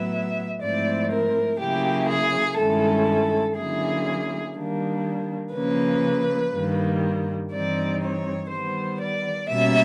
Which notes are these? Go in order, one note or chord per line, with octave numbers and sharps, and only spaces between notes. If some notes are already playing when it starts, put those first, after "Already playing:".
Already playing: A2 F#3 B3 E5
G#2 F3 A3 C4 E4 D5
A#4
C#3 F#3 A#3 C#4 E4 G4
G#4
G2 D#3 G#3 C#4 E4 A4
D3 F#3 A#3 C#4 E4 G#4
D#3 G3 A#3 D4
C#3 F3 A#3 C#4 B4
G2 D#3 G3 A#3
G2 E3 G3 C4 D#4 D5
C#5
D#3 G3 B3 C5
D5
B2 G3 A#3 C#4 E5